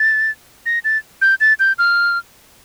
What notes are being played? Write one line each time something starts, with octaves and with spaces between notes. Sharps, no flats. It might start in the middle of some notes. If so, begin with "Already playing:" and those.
Already playing: A6
A#6
A6
G6
A6
G6
F6